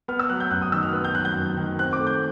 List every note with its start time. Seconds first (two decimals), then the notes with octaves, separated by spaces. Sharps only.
0.08 B3 F6
0.19 E6
0.29 F#3 F#6
0.40 G6
0.51 F#2 F#6
0.62 D#6
0.72 D#3 E6
0.83 F6
0.93 B3 F#6
1.04 G6
1.14 F#3 F#6
1.25 G6
1.37 F#2
1.57 D#3
1.79 C4 F#6
1.93 D6
2.00 A3
2.07 G6